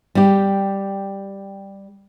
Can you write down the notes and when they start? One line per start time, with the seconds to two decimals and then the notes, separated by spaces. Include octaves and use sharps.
0.15 G3 G4